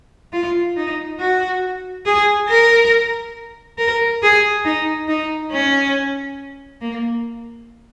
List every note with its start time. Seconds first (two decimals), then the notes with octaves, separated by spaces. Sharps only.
0.33 F4
0.77 D#4
1.19 F#4
2.06 G#4
2.49 A#4
3.78 A#4
4.22 G#4
4.65 D#4
5.08 D#4
5.51 C#4
6.81 A#3